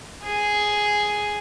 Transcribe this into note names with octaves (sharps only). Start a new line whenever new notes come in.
G#4